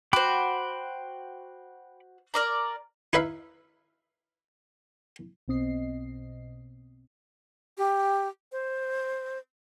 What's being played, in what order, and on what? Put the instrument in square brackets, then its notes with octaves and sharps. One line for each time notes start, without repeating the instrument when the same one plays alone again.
[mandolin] F#4 C5 [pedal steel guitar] G5 B5 D6
[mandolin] A#4 D5 A#5
[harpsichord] D#4 E4 B4 E5 F5
[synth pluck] B1 B2 C4 D#5 C7
[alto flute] G4
C5